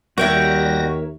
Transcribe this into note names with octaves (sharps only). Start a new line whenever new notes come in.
D#2 G3 F#4 A#4 C#5 E5 G5 A#6